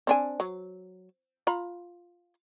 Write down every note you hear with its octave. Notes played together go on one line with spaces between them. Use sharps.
C4 D4 G#5
F#3
F4 A#5 B5